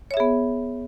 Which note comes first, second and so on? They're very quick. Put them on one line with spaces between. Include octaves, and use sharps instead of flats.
C#5 E5 G#4 B3